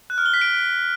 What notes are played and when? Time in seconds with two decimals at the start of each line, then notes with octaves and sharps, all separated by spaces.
0.10 F#6
0.18 F6
0.26 G7
0.34 B6
0.41 D7